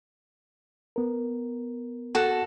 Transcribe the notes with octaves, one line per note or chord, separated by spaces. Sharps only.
B3 A#4
F#4 A4